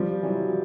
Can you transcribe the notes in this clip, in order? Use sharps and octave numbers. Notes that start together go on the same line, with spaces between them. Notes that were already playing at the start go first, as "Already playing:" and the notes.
Already playing: F3 G3
E3 F#3